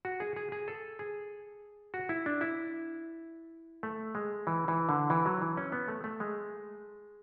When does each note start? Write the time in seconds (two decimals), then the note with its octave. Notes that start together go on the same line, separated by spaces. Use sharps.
0.05 F#4
0.20 G#4
0.36 G#4
0.52 G#4
0.68 A4
0.99 G#4
1.94 F#4
2.09 E4
2.26 D4
2.41 E4
3.83 A3
4.15 G#3
4.47 E3
4.68 E3
4.89 D3
5.10 E3
5.26 F#3
5.42 E3
5.57 C#4
5.72 B3
5.88 A3
6.04 A3
6.20 G#3